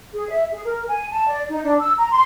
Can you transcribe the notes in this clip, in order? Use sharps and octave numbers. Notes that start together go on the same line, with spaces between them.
G#4
E5
G#4
A#4
G#5
A5
D5
D#4
D4
E6
A#5
C6